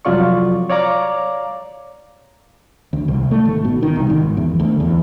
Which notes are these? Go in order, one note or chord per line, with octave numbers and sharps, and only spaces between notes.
C2 F2 F#3 F4 D5 C#6
C#5 D5 F5 A#5 D6
D2
C2
A3
G#1
B2
D#3
C2
G#1
E2
D2
E2